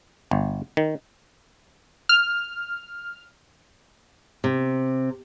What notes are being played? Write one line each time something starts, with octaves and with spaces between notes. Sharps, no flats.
G1
D#3
F6
C3